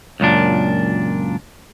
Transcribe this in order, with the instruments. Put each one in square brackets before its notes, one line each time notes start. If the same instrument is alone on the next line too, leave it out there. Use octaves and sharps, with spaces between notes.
[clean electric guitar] C#2 F#2 A#2 D4